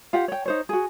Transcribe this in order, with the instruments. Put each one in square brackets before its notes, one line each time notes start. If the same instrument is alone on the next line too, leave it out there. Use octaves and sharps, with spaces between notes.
[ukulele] F4 G4 F#5
C#5 G5
D#4 C5 C#5
F#4 G#4